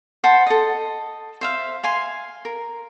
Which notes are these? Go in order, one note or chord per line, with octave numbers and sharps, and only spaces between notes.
C5 F#5 A5 B5
A4 D#5
C5 E5 F5
F5 G#5 C6
A#4